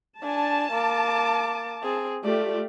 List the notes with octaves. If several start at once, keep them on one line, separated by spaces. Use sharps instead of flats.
D4 G#5 A5
A#3 D6
C4 G#4
A3 F4 G4 D5